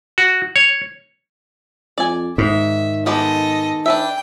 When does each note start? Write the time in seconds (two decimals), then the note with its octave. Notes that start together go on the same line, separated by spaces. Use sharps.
0.18 F#4
0.56 C#5
1.98 F2 D5 G#5
2.38 G#2 D#3 E5
3.06 G#3 B3 G4 A4 D#5
3.86 D4 B4 E5 G5